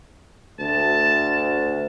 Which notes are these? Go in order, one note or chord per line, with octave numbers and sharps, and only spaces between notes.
D2 A5